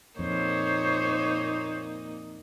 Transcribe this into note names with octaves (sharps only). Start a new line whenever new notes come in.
F2 A#2 A#3 D#4 C5 C#5